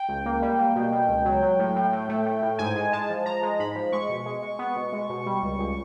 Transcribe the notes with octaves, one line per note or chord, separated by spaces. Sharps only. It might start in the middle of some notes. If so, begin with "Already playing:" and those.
Already playing: G5
C#2
A#3
G3
A#3
B2
B2
C#2
F#3
F#3
A2
A2
A2
A3
A3
A2
G#2 G#5
G#3
G#3 A5
F3
F3 A#5
G#3
G#2 B5
F3
G#3 C#6
B2
G#3
G#3
B3
B2
G#3
B2
G3
C#2
C#2